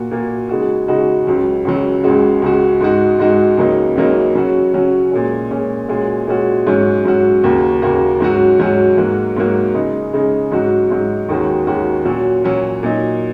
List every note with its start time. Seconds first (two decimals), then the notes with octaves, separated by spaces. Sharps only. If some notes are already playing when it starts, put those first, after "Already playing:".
Already playing: A#2 A#3 F#4
0.11 A#2 A#3 F#4
0.49 C#3 G#3 D#4 F#4
0.88 C#3 G#3 D#4 F#4
1.27 C#2 C#3 F#3
1.65 C#2 C#3 F#3
2.04 C#2 C#3 G#3 F#4
2.42 C#2 C#3 G#3 F#4
2.81 G#2 G#3 D#4 F#4
3.19 G#2 G#3 D#4 F#4
3.58 C#2 C#3 F#3 A#3 D#4
3.96 C#2 C#3 F#3 A#3 D#4
4.35 C#3 F#3 C#4 F#4
4.74 C#3 F#3 C#4 F#4
5.11 A#2 G#3 C#4
5.51 A#2 G#3 C#4
5.89 A#2 G#3 C#4 F#4
6.27 A#2 G#3 C#4 F#4
6.67 G#2 F#3 C#4 F#4
7.05 G#2 F#3 C#4 F#4
7.44 D#2 C#3 A#3 F#4
7.82 D#2 C#3 A#3 F#4
8.20 G#2 F#3 C#4 F#4
8.59 G#2 F#3 C#4 F#4
8.98 G#2 F#3 A#3 F#4
9.36 G#2 F#3 A#3 F#4
9.74 C#3 G#3 D#4
10.13 C#3 G#3 D#4
10.51 G#2 F#3 D#4 F#4
10.91 G#2 F#3 D#4 F#4
11.29 D#2 D#3 G#3 C#4 F#4
11.67 D#2 D#3 G#3 C#4 F#4
12.05 A#2 F#3 C#4 F#4
12.44 A#2 F#3 C#4 F#4
12.83 A#2 F#3 D#4